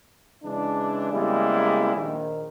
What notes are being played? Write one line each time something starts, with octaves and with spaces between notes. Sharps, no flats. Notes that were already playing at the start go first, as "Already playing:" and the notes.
C#3 E3 G#3 D4
C#3 G3 G#3 A#3 B3 E4
A#1 D#3